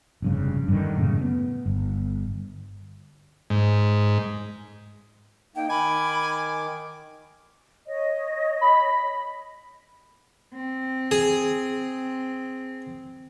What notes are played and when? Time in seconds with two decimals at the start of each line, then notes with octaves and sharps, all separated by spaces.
0.22 F1 G2 C#3
0.68 G2 D3 D#3
0.97 F#2 A2 C#3
1.21 B3
1.66 G1
3.50 G#2
5.56 A#3 D#4 G5
5.70 D#3 G#5 B5 D6
7.88 C#5 D#5
8.61 B5
10.55 C4
11.11 G#4